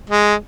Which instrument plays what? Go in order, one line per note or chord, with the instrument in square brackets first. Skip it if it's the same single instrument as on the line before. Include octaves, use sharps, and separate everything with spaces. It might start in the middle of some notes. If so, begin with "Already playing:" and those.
[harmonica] G#3